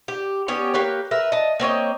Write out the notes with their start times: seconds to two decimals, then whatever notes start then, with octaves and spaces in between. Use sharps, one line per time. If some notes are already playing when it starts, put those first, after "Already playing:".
0.08 G4
0.48 B3 C#4 G4 C#5
0.74 A#3 G4 B4 C#5
1.11 A#4 B4 E5
1.32 D#5 A5
1.60 A#3 C4 C#5 D#5